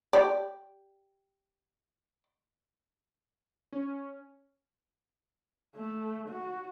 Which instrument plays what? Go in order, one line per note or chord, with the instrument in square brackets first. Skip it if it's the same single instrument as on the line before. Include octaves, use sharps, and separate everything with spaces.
[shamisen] G4 D5
[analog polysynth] C#4
[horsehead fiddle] A3
F#4